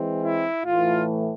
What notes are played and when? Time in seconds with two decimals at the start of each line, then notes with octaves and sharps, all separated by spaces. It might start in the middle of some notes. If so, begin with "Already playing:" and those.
Already playing: E3 G#3 C4
0.21 E4
0.64 A2 E3 A3 F4